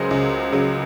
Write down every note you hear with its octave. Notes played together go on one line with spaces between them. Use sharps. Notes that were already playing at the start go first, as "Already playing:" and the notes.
Already playing: C#2 C#3 F#3 G#4 A#4 C5
C#2
C#3 F#3